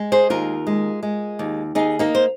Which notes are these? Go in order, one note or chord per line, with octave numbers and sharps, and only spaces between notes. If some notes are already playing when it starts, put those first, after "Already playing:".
Already playing: G#3
G#4 C5
D#2 F4 A#4
G#3
G#3
D#2
D#2 D#4 G#4
A#3 D#4
C5